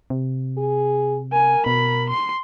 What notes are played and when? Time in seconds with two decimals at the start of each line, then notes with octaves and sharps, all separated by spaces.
0.10 C3
0.58 G#4
1.33 A#4 G#5
1.66 B2 B5
2.10 C6 C7